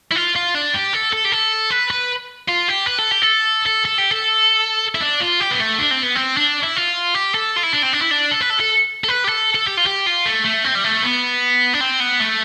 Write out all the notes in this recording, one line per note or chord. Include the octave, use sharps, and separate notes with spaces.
E4
F4
F4
D4
G4
A4
A4
G4
A4
B4
B4
F4
G4
B4
A4
G4
A4
A4
A4
G4
A4
E4
D4
F4
G4
B3
A3
D4
C4
B3
C4
D4
E4
F4
G4
A4
F4
E4
D4
C4
D4
E4
D4
A4
B4
A4
A4
A4
B4
G4
A4
A4
G4
F4
G4
F4
A3
A3
C4
G3
A3
B3
D4
C4
B3
A3